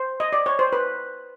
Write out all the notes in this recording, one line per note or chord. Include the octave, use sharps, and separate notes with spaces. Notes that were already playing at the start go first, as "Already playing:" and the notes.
Already playing: C5
D#5
D5
C#5
C5
B4